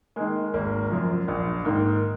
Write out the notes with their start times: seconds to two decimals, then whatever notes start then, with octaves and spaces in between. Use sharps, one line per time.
0.16 D#3 G#3 A#3
0.53 G#1 A#3
0.91 F#2 F3
1.28 A#1
1.65 G#2 D#3 A#3